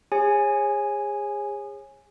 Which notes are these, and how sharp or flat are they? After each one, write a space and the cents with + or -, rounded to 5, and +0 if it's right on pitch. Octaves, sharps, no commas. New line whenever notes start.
G#4 -30 C#5 -25 G#5 +0